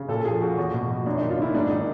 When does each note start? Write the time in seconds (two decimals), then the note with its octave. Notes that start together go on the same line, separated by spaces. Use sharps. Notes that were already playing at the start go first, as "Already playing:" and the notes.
Already playing: C#3
0.08 A#2 A4
0.25 F3 G#4
0.41 F3 F#4
0.57 E2 F#4
0.74 B2
0.90 B2
1.06 F#2 D4
1.18 D#3 D#4
1.31 F4
1.39 D#3 E4
1.54 G#2 D4
1.70 D#3 D#4